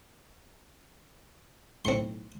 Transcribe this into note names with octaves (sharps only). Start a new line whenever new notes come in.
B1 A2 C4 C6 C#7